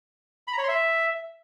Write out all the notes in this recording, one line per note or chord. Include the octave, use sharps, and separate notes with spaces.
B5
A#5
C#5
C6
E5